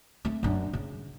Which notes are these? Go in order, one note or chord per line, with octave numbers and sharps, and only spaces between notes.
A3 C4
F#2 D4
C#3